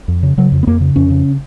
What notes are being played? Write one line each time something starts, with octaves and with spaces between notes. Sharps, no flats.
F2
C#3
C#3 F#3
F2
B3
F2 A#3
C#3
F2 C#4
C#3